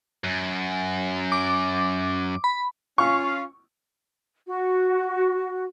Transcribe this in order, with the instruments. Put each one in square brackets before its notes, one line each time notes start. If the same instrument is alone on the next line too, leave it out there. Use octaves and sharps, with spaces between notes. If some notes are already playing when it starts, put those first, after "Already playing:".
[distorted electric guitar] F#2
[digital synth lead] D6
B5
[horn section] C#4 F4 F5 [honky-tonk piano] C#6
[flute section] F#4